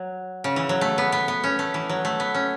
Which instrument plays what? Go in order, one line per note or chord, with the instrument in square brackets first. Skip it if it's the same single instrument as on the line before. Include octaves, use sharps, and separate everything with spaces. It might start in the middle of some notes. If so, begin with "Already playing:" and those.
Already playing: [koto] F#3
C#3
E3
F#3
A3
B3
B3
B3
C#4
A3
E3
F#3
A3
B3
C#4